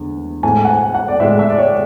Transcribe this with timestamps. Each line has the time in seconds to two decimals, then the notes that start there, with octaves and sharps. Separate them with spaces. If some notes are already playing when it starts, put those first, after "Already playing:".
Already playing: E2 D3
0.43 A2 G#3 G#5
0.65 F#5
0.69 G#5
0.94 F#5
1.08 D5
1.20 A2 G#3 E5
1.39 E5
1.50 D5
1.58 C#5